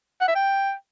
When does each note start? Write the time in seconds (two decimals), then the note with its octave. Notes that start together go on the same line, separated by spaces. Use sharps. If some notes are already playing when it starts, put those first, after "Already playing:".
0.21 F#5
0.28 E5
0.35 G5